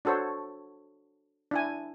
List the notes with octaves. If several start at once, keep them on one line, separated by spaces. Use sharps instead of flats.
D4 F#4 A4 C5 C#5
D4 E4 G#5